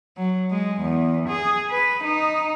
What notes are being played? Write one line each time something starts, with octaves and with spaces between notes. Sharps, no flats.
F#3
G#3
E2
G#4
B4
D#4